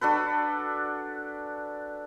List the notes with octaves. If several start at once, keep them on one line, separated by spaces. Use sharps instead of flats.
D4 F#4 A4 B4